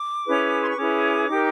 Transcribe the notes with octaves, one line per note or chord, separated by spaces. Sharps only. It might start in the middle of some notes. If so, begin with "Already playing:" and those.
Already playing: D6
C#4 E4 G#4 B4
C6
C#6
C#4 E4 G#4 B4 D6
D#4 G4 A#4